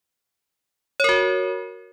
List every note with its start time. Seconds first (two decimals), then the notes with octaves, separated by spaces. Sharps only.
1.00 C#5
1.04 A#4
1.09 F#4